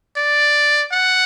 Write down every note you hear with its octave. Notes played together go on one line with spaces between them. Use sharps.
D5
F#5